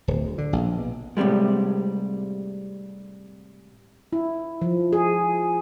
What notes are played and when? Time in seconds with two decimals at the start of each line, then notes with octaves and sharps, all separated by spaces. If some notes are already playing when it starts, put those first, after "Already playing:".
0.08 D1
0.25 D2
0.38 D3
0.53 A#1
0.78 B2
1.17 A2 C3 D#3 G3 G#3
4.13 E4
4.62 F3
4.93 G#4